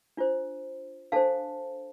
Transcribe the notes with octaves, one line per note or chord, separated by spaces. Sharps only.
D4 F4 C5
D4 A4 C5 F5 A5